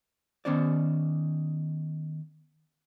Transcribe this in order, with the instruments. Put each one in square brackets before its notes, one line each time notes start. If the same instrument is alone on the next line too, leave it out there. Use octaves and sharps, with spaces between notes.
[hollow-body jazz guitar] D#3 B3 C#4 C5 D5